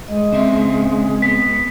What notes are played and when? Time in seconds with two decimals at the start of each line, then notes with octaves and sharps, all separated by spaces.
0.08 G#3 D#5
0.32 C#3 C4 E5
1.22 B3 B6